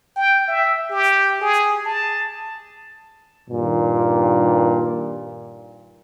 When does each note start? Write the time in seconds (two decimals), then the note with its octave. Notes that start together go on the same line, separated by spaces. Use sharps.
0.16 G5
0.48 E5
0.91 G4
1.41 G#4
1.86 A5
3.50 G2 A#2 D#3